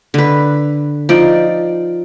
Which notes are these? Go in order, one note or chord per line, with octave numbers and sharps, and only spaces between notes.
D3 B4
F3 D#4 D5